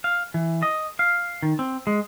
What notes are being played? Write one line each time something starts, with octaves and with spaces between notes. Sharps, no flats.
F5
E3
D#5
F5
D#3
C4
G#3